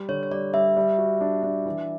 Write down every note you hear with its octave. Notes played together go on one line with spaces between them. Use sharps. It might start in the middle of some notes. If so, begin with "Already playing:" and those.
Already playing: G3
D3 C#5
C#5
G3 D5
G3 E5
G3
F#4
D4
D4
E3